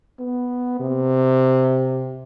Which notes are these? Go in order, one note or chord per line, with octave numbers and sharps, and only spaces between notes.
B3
C3